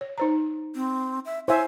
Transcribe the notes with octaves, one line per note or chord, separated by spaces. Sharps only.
C#5
D#4 C5 A#5
C4
E5
E4 C5 C#5 E5 G#5